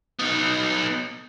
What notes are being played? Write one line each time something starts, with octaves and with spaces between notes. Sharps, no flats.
B3 D#4